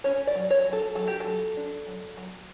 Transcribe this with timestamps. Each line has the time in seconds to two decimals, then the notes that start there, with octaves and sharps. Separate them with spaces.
0.04 C#4 C#5
0.27 D5
0.35 F#3
0.50 C#5
0.65 F#3
0.73 A4
0.95 F#3 A4
1.08 G4
1.20 A4
1.26 F#3
1.57 D4
1.87 F#3
2.17 F#3